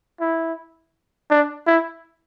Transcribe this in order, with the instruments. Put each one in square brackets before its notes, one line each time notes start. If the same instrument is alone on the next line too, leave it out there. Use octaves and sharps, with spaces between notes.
[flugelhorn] E4
D4
E4